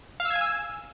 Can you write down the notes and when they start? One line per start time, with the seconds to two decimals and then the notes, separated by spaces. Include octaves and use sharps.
0.20 F5
0.25 E6
0.30 G#6
0.36 G#5
0.41 E6